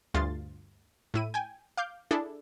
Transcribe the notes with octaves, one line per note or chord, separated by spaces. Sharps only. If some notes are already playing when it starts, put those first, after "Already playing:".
D2 G2 F4 C6 A6
A2 E4 D#7
G5 G#5
F5 D6 G6
D4 E4 G#4 A4